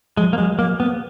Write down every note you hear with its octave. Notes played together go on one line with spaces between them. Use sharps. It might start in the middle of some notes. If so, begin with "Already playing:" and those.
F3 G#3
A#3
F#3 G#3
F#3 A#3
A#3 B3